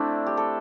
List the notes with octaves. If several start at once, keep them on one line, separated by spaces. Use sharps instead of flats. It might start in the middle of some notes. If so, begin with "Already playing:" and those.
Already playing: A3 C4 D4 E4
G4
A4